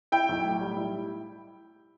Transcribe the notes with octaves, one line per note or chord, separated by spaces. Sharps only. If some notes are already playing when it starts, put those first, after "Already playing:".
E4 G5
B1
A2
G3
E4